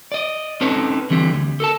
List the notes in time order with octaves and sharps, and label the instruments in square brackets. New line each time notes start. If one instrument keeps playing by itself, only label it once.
[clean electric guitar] D5 D#5
C4 C#4 D#4 A4 B4 C#5
D3 E3 G3 C4
D2
A4 A#4 A5